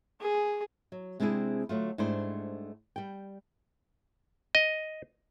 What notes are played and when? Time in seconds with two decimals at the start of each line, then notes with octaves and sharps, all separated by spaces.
0.21 G#4
0.92 F#3
1.20 C3 G#3 C4 D4 E4 G#4
1.69 D3 F#3 A3 F4
1.98 G#2 G3 A3 D4 E4 C5
2.96 G3 G5
4.55 D#5